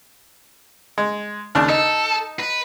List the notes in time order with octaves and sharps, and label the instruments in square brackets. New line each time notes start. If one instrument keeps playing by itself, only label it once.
[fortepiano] G#3
D#2 C#3 D4
[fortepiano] D#4 [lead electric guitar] A4
[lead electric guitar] B4